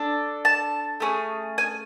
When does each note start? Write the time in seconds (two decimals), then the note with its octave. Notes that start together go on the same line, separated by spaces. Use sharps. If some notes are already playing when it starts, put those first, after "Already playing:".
Already playing: D4 A4
0.45 A5
1.00 A3 C#4 G#4
1.58 G#5